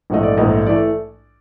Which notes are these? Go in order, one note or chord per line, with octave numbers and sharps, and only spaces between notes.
A#1 G#2 E3 A3 D#5
D5
A#1 G#2 E3 A3 D#5
E3 A3 D5